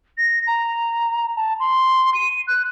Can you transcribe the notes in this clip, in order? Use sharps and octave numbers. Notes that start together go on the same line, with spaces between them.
A#6
A#5
A5
C6
D#7
F#6